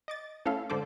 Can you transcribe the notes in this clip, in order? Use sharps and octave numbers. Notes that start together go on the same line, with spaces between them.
D#5 D6 A6
A3 C#4 E4 A4 F5
G#2 D3 A4 C5 D5 D6